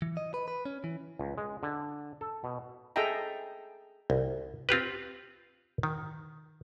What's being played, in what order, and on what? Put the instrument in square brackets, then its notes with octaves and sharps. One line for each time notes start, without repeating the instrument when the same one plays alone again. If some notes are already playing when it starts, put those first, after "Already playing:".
[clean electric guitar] E3
D#5
B4
B4
C#4
E3
[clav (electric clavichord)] C#2
G#3
D3
A4
B2
[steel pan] G#4 A4 D#5 E5 G5 A#5
[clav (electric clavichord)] C2
C4 F4 G4 B4
D#3